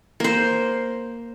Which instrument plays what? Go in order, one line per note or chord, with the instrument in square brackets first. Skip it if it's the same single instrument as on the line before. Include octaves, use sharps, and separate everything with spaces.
[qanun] A#3 C5